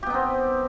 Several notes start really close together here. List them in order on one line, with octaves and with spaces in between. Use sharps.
G4 B3 D#4 C4